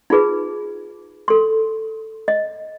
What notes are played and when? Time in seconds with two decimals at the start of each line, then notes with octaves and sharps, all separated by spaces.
0.10 D#4 F4 G#4 B4
1.28 A4 C6
2.28 D#5